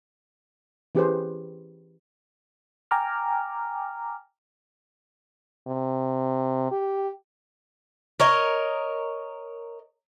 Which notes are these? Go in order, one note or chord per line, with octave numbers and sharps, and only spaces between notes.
E3 C#4 G4 G#4 B4 C5
G5 G#5 A#5 D6 F6
C3
G4
A#4 C#5 D#5